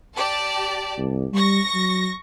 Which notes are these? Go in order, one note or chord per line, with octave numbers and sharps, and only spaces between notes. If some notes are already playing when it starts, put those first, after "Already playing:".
G4 D5 A5
C2
G3 C#6 A#6
F#3